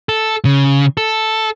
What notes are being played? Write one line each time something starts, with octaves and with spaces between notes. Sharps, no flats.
A4
C#3
A4